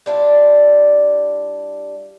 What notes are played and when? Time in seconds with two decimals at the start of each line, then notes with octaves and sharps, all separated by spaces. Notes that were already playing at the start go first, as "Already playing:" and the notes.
0.06 G3 D4 E4 F4